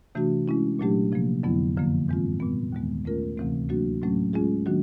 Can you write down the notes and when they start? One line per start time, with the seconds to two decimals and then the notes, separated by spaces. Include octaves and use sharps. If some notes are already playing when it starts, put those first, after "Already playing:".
0.15 C3 E3 A3 D4 F#4
0.48 G#3 C#4 E4
0.79 A#2 F#3 A3 D4 G4
1.12 C3 F3 A#3
1.43 F2 D3 F#3 B3 E4
1.77 F#2 D3 F3 A#3
2.08 G#2 E3 G#3 C4 F4
2.40 A#2 G3 B3
2.73 D#2 D#3 G#3 B3
3.05 A3 C#4 F4 A#4
3.38 D2 C3 E3 A3 C4
3.69 F#3 A#3 D4 F#4
4.02 A2 F#3 A3 C#4
4.33 G#3 C#4 F4 G#4
4.66 D#3 F#3 A#3 D4 F#4